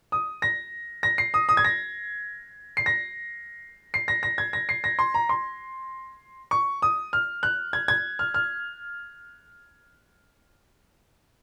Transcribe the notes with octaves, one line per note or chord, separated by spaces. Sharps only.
D#6
A#6
A#6
C7
D#6
D#6
G#6
A#6
C7
A#6
C7
A#6
A#6
G#6
A#6
C7
A#6
C6
A#5
C6
C#6
D#6
F6
F#6
G#6
G#6
F6
F6